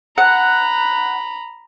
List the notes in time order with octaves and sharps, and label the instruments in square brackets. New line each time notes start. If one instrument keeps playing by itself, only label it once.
[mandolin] F#5 [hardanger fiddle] A#5 B5